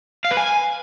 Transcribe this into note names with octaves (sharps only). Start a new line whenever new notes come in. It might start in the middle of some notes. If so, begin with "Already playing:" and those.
F5
B4
G#5